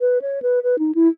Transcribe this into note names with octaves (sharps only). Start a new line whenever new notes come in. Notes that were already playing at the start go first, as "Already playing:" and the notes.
B4
C#5
B4
B4
D#4
E4